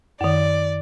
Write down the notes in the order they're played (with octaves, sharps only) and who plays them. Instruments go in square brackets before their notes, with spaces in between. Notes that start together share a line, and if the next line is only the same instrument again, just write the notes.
[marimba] F#2 D#3 [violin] D5